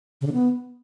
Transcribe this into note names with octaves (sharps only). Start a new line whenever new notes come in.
C#3
D3
B3